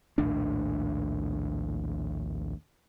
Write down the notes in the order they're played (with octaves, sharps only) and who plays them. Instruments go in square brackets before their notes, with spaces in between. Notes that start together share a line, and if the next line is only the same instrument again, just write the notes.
[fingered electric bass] A#1 D#2 A2 D4